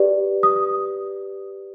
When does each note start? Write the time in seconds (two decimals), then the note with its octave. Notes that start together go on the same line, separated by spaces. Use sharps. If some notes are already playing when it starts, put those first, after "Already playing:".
Already playing: G4 B4 D5
0.43 D#6